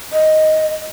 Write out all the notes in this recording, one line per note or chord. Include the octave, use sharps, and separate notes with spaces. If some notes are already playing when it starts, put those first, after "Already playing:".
D#5